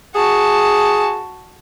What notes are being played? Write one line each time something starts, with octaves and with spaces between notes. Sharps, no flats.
F#4 G#4 A5